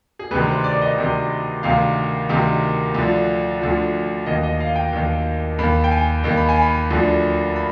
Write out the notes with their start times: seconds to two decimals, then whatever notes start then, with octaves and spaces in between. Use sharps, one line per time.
0.19 G#4
0.31 D2 C3 D#3 B4
0.48 C5
0.64 D5
0.82 D#5
0.98 D2 C3 D#3
1.63 D2 C3 D#3 F5
2.29 D2 C3 D#3
2.95 D2 D3 F3
3.61 D2 D3 F3
4.26 D#2 D#3 D#5
4.43 D#5
4.60 F5
4.76 G5
4.93 D#2 D#3
5.58 D#2 D#3 B5
5.84 G5
5.91 G#5
6.24 D#2 D#3
6.37 B5
6.49 G#5
6.62 B5
6.90 D2 D3 F3
7.56 B5